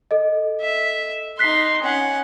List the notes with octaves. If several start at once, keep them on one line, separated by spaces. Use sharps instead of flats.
A4 D#5
E5
D#4 C6 F#6 B6 C7
C#4 F#5